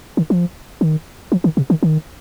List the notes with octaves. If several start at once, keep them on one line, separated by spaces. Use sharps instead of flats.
D#3
F3
D#3
F3
D#3
C3
D#3
D#3